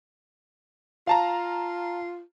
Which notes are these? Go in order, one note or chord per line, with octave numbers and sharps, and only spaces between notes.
F4 F5 A5 A#5